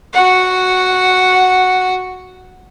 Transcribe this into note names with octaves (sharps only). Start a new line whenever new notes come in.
F#4 F#5